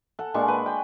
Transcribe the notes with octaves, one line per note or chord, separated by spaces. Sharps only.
A4 F#5
A#2 G#3 D4 C#6
B4
G5